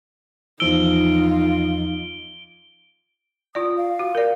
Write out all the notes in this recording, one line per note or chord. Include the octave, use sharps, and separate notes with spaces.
E2 F3 D#4 F4 E6 D7 G7
F4 D5 D#6
F5
F#4
A#4 D5